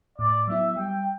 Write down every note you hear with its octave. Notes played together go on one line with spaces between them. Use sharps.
A2 D5
F#3 B3 E4 E5
G3 G5